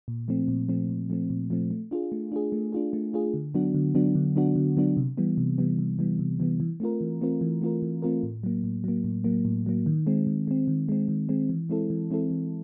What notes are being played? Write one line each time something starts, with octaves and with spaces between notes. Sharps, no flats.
A#2
F3 A3 C4
A#2
F3 A3 C4
A#2
F3 A3 C4
A#2
F3 A3 C4
A3
D4 F4 G#4
A3
D4 F4 G#4
A3
D4 F4 G#4
A3
D4 F4 G#4
D3
F#3 B3 D4 F#4
D3
F#3 B3 D4 F#4
D3
F#3 B3 D4 F#4
D3
F#3 B3 D4 F#4
C3
E3 G3 B3
C3
E3 G3 B3
C3
E3 G3 B3
C3
E3 G3 B3
E3
A3 C4 F4 A#4
E3
A3 C4 F4 A#4
E3
A3 C4 F4 A#4
E3
A3 C4 F4 A#4
A2
F#3 A#3
A2
F#3 A#3
A2
F#3 A#3
A2
F#3 A#3
D#3
G#3 C4
D#3
G#3 C4
D#3
G#3 C4
D#3
G#3 C4
E3
G#3 C4 E4 A4
E3
G#3 C4 E4 A4
E3